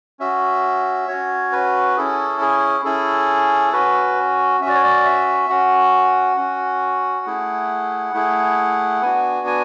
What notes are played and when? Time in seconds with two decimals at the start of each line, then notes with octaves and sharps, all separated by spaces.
0.20 C#4 F#4 E5
1.08 C#4 F#4 C#5
1.52 B4
1.97 C#4 E4 G#4 A4
2.41 G#4
2.85 C#4 E4 G#4 A4
3.73 C#4 F#4 B4
4.61 C#4 E5
4.66 F#4 D5
4.75 C#5
4.83 D5
5.05 E5
5.49 C#4 F#4 F#5
6.37 C#4 F#4
7.26 A3 E4 G#4
8.13 A3 E4 G#4
9.02 B3 D4 F#4 G#5
9.47 G#5